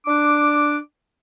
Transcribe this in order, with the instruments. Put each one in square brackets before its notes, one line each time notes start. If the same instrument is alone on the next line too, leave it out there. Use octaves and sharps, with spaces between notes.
[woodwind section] D4 D6